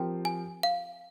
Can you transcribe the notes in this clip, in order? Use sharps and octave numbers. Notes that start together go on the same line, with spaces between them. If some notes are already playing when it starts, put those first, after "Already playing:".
Already playing: F3 C4 G4 A#4 G5
G#5
F5